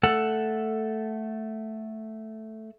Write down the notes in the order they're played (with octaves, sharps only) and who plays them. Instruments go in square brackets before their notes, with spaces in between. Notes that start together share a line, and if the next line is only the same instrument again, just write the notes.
[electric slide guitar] A3 A4 F#5